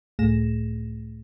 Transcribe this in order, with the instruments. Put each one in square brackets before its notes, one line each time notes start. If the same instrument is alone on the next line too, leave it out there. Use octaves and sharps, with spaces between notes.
[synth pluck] C#2 A2 A3 G#4 A#6 E7